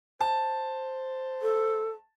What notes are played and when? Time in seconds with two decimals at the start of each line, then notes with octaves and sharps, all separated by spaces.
0.21 C5 A5
1.42 A4